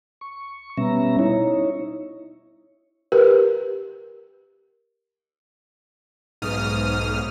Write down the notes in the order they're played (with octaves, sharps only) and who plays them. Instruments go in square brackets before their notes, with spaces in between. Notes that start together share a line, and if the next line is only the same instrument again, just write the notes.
[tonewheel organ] C#6
B2 G3 B3 C#4 E5 A#5
D#4 E4 C#5
[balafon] G4 A#4 B4
[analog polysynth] B1 G#2 D#6 F6